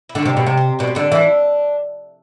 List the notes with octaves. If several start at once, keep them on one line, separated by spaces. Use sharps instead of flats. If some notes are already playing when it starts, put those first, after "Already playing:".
E4
D3 F#4
C4
C3 D4
B2 E4
C3
C4
B2 D4
C4
D3 D4
E3